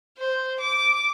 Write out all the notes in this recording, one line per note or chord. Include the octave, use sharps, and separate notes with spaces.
C5
D6